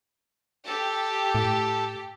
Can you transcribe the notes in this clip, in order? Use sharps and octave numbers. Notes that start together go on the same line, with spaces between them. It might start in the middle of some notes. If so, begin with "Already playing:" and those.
G4 A4 A5
A2